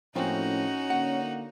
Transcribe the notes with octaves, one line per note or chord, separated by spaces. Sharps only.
A2 F3 A#3 C4 C#4 D#4 F#4
D3 A#3 F#5